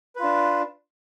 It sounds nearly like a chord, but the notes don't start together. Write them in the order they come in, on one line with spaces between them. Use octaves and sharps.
B4 F4 D4